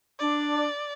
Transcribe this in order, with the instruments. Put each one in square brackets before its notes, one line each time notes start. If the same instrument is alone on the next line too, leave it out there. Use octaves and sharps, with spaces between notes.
[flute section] D4 [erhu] D5